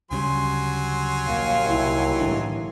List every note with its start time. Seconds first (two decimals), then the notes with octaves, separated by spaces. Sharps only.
0.11 D2 C#3 F#3 G3 G#5 C6
1.27 A#1 D#2 A#2 F5
1.69 C2 E4
2.19 A1 G2 D3